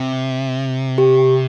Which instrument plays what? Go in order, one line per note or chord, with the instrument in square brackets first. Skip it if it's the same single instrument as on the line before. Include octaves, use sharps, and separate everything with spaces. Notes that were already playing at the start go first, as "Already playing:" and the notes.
Already playing: [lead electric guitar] C3
[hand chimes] G4